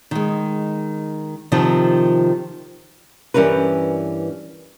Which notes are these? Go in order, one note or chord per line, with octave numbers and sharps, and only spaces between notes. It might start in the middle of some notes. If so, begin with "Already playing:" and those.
D#3 G#3
C3 D#3 F3
G2 E3 G3 C#4 A#4 B4